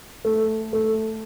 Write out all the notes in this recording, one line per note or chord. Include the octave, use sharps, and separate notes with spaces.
A3
A3